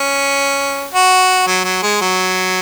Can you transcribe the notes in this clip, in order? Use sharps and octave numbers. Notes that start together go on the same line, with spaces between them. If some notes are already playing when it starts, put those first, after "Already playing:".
Already playing: C#4
F#4
F#3
F#3
G#3
F#3